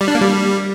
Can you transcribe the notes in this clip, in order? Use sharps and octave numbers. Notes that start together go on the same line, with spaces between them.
G3
D4
A#3
G3